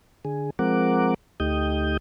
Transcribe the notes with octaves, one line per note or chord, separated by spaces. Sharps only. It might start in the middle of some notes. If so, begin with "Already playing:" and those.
D3 G#4
F3 G#3 C4 A#4 F#5 D6
D2 A3 D#4 G4 D#6 G6